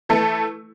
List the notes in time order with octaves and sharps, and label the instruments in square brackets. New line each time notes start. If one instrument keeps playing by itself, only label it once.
[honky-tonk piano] E3 A3 E4 A4